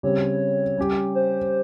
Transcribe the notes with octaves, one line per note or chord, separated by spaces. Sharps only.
C#3 G3 C4 G4 C#5
G3 C#4 G4
C5